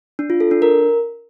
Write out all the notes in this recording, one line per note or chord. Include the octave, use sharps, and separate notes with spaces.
D4
F4
A4
D4
A#4